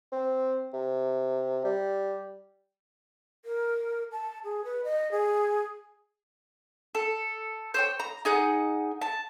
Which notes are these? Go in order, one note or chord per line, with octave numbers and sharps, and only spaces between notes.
C4
C3
G3
A#4
A5
G#4
B4
D#5
G#4
A4
C5 C#5 G5
A#5
D#4 G#4 F#5
A5